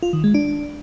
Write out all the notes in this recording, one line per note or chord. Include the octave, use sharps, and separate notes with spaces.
F4
D#3
G#3
D4